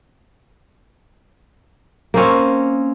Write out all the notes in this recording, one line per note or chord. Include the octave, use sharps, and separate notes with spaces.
A#3 C4 C#4